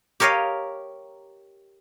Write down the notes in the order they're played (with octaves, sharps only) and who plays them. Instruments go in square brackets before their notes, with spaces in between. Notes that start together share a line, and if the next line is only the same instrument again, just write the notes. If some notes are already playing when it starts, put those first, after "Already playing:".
[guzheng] G4 A#4 C#5 D#5 F5